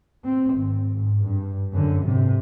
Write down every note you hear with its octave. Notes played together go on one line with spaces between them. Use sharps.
C4
G#1
G#2
G2
F#2 D3
G#2 C3